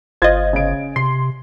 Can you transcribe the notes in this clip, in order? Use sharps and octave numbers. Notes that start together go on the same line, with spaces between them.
G1 F4 C5 D#5 G#6 A6
C#3 D7
C3 C6 C7